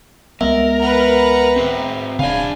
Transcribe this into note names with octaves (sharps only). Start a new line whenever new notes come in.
C#2 G#3 B3 A#4 E5
B4 F#5 A#5
C4 G#4 C5
D#1 C#3 D4 F5 G#5